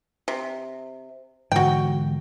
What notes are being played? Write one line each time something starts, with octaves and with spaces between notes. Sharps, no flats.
C3
G#2 D3 E3 F#4 G5